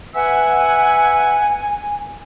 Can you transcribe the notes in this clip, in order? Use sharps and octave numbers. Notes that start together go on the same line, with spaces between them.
B4 E5 F#5 G#5